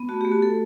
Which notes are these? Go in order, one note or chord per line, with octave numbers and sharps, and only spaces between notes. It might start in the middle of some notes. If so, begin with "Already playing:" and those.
Already playing: B3
A3 F#4
A3 G4
F#4
A3 A4